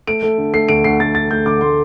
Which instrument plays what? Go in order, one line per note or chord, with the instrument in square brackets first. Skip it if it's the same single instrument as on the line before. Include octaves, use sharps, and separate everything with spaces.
[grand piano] A3 D7
A3
D3
A3 C7
D2 D7
D2 C7
D2 A6
D2 A6
A3 G6
D3 D6
A3 C6